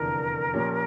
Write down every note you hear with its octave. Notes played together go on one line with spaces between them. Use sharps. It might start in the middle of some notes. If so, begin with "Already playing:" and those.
Already playing: F1 E2 D3 A#4
A#2 F3 C#4 G4